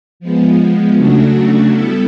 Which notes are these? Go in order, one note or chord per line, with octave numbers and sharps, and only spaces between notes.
F3 G#3 B3
C#3 F#3 A3 D4 F#4
G3 B3 E4 A4